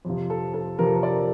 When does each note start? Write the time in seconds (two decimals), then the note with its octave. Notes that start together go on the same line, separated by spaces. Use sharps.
0.05 F2 C3 F3
0.30 A4
0.54 A4
0.79 F2 C3 F3 A#4
0.86 A4
0.95 A#4
1.03 D5